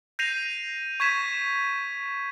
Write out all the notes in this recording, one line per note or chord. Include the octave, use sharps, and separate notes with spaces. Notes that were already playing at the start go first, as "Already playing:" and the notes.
G6 A#6 C7 D#7 F7
C#6 G#6 B6 E7